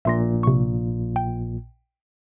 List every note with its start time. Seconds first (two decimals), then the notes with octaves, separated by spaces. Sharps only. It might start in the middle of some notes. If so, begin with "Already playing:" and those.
0.05 A#1 A#2 E5 C6 A#6
0.43 C3 C#6
1.16 G5